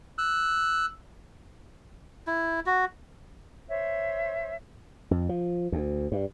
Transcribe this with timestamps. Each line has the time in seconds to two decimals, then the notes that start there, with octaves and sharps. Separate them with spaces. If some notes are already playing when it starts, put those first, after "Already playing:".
0.18 E6 F#6
2.27 E4
2.66 F#4
3.68 C5 C#5 E5
5.11 F2
5.29 F3
5.72 D2
6.12 G2